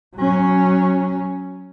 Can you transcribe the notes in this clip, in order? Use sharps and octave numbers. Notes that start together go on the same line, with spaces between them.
F#3 C#4